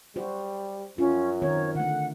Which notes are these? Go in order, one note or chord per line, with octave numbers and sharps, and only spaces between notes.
G3 F#4 C5
F#2 C#4 F4
D#3 C4 A#4 C#5
D3 A3 F#5